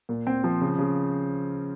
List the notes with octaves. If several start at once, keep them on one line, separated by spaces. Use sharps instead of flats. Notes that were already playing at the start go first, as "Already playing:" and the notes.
A#2
C4
F3
C#3
C#3